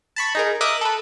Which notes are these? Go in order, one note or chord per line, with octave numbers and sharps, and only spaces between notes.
A5 B5 C#6
D#4 G#4 A#4
A#4 D#5 E5 D6 D#6 F#6
A4 B4